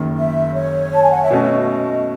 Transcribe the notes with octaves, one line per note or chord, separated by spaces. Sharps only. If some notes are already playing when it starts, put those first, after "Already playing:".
Already playing: F#1 F#2 D#3
E5
C#5
A5
G#5
F#5
E5
B2 A3 C#4 D#5